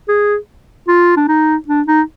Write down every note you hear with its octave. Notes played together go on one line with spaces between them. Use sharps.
G#4
F4
D4
D#4
D4
D#4